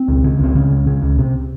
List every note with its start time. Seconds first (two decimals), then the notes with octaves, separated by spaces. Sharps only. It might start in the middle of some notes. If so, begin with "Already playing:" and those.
Already playing: C4
0.08 C#2
0.24 C#3
0.40 C#2 C4
0.55 C#3 C#4
0.71 C#2
0.87 C#3
1.02 C#2
1.18 C3